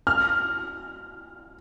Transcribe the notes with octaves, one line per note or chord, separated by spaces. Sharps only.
F6